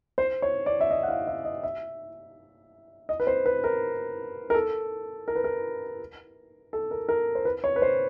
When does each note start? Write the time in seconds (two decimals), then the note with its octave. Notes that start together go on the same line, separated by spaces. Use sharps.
0.18 C5
0.42 C#5
0.66 D5
0.81 E5
0.91 D#5
1.03 F#5
1.08 F5
1.28 E5
1.45 D#5
1.63 E5
3.09 D#5
3.20 B4
3.27 C5
3.46 B4
3.64 A#4
4.50 A#4
4.54 A4
5.28 A#4
5.36 B4
5.44 A#4
6.73 A4
6.91 A#4
7.09 A#4
7.35 C5
7.45 B4
7.64 C#5
7.76 B4
7.82 C5